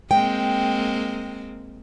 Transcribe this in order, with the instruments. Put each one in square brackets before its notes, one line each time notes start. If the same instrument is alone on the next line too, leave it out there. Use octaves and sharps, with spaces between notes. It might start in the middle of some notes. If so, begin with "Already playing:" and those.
[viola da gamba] G#3 A#3 C4 [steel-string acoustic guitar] G5